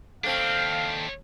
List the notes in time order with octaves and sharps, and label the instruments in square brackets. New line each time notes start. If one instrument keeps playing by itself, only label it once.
[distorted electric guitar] D#2 D4 [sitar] A3 C4 [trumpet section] F5